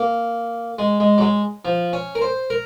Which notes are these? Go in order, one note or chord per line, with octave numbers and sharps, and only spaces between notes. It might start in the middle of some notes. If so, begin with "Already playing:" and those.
Already playing: A#3
G#3
G#3
F#3
G#3
F3
C#4
A#4
C5
A#4